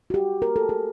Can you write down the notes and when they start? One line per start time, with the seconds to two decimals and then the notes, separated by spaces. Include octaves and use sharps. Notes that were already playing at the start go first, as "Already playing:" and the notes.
0.10 F#4
0.14 G4
0.42 A#4
0.56 A4
0.69 G#4